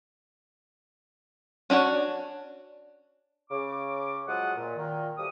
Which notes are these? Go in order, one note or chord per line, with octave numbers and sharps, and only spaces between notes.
C#4 D4 F#4 C#5
C#3 D6
F3 F#3 G#3 F4 F#5 D#6
A#2
A#2 D#3
D2 F3 G3 D#6